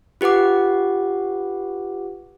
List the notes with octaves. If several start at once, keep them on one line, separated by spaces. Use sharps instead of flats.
F4 G4 B4 F#5 D6